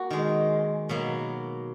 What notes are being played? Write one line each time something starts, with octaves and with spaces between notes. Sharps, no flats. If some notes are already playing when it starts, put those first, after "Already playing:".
Already playing: A#3 F#4
D#3 G#3
B2 F#3 A#3